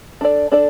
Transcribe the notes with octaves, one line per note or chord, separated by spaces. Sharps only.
D4 A4 D5
D4 A4 D5